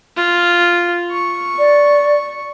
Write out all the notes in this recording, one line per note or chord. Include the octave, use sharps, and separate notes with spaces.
F4
C#6
D5